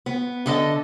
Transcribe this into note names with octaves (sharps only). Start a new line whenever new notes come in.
B3
D3 A4 D#5 A5